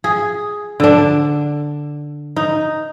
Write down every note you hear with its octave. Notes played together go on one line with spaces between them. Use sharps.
G#4
D3 D4
D#4